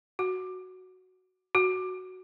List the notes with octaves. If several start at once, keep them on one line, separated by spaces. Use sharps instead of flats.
F#4
F#4